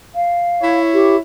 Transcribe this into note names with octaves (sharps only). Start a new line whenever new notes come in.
F5
E4 C#5
G4